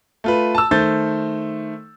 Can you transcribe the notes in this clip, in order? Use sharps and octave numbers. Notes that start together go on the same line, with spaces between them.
A3 F4 B4
A5 E6
D#3 A3 C5 G6 A6